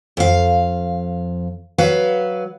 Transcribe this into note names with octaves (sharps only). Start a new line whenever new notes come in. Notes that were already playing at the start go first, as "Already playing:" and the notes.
F2 F5
F#3 B4 F5